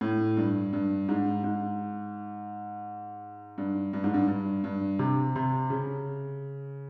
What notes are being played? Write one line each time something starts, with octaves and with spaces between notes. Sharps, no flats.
A2
G2
G2
G#2
G#2
G2
G2
G#2
G2
G2
G2
C3
C3
C#3